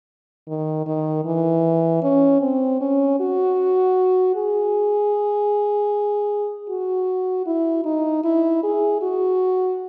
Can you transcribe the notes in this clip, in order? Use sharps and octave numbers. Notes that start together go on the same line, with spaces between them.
D#3
D#3
E3
C#4
C4
C#4
F#4
G#4
F#4
E4
D#4
E4
G#4
F#4